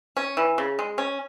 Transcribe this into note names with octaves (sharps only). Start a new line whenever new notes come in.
C#4
E3
C#3
G#3
C#4